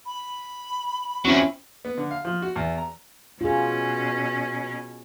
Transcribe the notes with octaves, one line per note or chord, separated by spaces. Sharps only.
B5
E2 F#3 C4 C#4 E4
B3
D3
F5
F3
F#4
E2
A#5
B2 C#4 F4 G#4